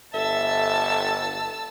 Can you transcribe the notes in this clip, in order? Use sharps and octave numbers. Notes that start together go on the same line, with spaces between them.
G1 A4 E5 A5 E6